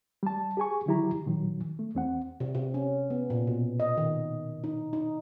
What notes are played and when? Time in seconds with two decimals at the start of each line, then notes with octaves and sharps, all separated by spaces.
0.23 G3 A5
0.57 G4 G#4 G#5 C#6
0.86 D3 D#3 F#3 E4 G4 A#5
1.26 A#2 D#3 F#3
1.79 A3
1.95 E2 C4 F#5
2.40 C3
2.55 C3
2.74 C#4
3.10 B3
3.30 A#2
3.47 B2
3.80 D#5
3.97 D#3
4.64 D#4
4.93 D#4